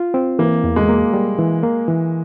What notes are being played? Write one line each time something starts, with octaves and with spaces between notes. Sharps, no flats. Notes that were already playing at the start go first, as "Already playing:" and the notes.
Already playing: F4
C4
E3 A#3
E2
G#3
A#3
G3
E3
A#3
E3